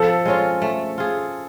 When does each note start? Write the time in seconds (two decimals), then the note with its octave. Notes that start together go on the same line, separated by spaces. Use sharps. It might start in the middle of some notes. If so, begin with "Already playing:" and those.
Already playing: F3 A4
0.25 G#3 C#4 F4
0.62 A3
0.98 F4 G#4